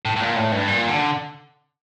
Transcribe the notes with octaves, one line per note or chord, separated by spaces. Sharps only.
A2
A2
A#2
A2
G2
A#2
D3